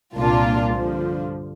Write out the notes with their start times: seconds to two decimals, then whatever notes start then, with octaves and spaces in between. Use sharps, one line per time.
0.16 C2 A#2 A#3 D4 F4
0.74 G2 D3 F3